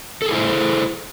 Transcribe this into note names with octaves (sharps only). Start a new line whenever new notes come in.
E4 G#4 A4 C5